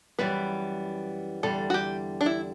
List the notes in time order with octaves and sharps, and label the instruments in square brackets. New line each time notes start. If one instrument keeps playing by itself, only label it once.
[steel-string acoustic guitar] F#2 E3 G3 B3 [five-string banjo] B4
[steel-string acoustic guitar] E2 D3 G3 [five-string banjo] A4
[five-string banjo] F#4
G4
D4
E4